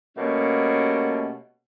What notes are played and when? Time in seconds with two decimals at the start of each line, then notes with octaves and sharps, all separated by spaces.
0.18 B2 G3 A3 A#3 C#4